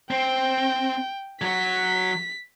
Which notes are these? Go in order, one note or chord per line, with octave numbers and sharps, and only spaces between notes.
C4 G5
F#3 F#4 B6